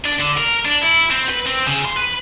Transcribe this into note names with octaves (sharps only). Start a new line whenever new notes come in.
D4
D3
A#4
D4
E4
C4
B4
C4
C#3
C6
B4